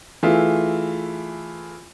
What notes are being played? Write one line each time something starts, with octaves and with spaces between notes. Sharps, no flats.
E3 A3 F4 G#4 E5